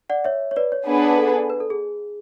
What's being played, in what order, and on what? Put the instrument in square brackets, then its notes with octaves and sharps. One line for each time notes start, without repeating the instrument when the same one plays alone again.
[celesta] D5 F#5
C#5 E5
C#5
B4 D5
C#5
[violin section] B3 D4 G#4 B4
[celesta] A4
B4
A4
G#4